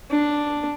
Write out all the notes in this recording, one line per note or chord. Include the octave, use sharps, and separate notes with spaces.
D4